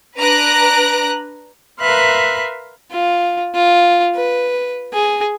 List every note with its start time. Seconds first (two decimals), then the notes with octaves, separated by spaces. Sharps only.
0.18 D4 B4 A#5 F#6 A#6 D7
1.80 A#4 B4 E5 F5 C6 F#6
2.91 F4
3.55 F4
4.16 B4
4.93 G#4